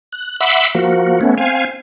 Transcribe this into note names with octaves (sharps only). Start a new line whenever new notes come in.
F#6
E5 F#5 B5 C6 D6 E6
F3 A#3 F#4
A3 B3 C#4
C4 F5 G#5